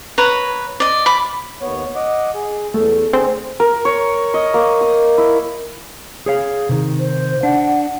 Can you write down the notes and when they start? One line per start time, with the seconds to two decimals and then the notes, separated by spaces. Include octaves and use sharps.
0.18 B4 C#5 A#5
0.80 D5 D#5
1.06 B5 D6
1.61 D#2 B3 C#5
1.96 D#5 F#5 D6
2.35 G#4
2.74 E2 A3
3.13 D3 C4 G#4
3.60 A#4
3.85 C#5
4.34 D#5
4.54 A#3
4.81 D#6
5.18 E4
6.26 G#4 C#5 F5
6.69 C3 D#3
6.99 C5
7.43 D4 F#5